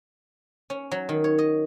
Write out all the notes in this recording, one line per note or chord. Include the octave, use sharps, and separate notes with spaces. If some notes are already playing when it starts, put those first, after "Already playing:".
C#4
F#3
D#3
C#5
D#5